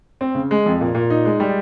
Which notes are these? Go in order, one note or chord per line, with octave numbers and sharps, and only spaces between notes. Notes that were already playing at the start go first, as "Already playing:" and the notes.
C4
C#3
G#3
F2
A#2
A#2
D#4
G#3
G3